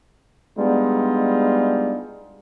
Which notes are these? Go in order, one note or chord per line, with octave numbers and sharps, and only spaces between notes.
G3 G#3 B3 D4 D#4 F4